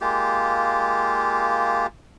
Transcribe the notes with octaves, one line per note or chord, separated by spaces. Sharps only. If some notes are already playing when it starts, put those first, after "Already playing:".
G#3 A#3 F4 G4